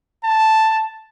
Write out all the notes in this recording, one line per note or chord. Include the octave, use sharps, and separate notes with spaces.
A5